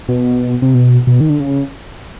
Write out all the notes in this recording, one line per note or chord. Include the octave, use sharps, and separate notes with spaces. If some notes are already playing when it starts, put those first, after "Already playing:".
B2
C3
B2
B2
D#3
D3
C#3